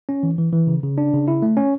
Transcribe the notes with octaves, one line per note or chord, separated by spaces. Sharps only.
C#4
E3
E3
E3
C#3
C#3
D4
C#3
E4
A3
C#4